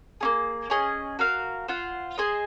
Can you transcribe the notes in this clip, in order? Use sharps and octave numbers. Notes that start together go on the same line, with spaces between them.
A#3 C#4 G#4
C#4 G#4 D#5
F#4 A#4 F5
F4 C5 F#5
G#4 C5 D#5 G#5